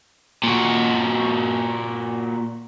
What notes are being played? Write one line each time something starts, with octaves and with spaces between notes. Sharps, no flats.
A#2 F#4